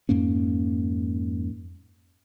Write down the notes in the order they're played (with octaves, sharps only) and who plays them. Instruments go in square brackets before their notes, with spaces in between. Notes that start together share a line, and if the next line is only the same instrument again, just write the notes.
[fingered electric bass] F2 G#2 A#3 C#4